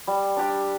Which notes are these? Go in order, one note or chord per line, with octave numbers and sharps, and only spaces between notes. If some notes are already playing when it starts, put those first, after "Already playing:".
G3
D4 G4 D5